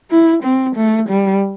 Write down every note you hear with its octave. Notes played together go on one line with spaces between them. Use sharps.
E4
C4
A3
G3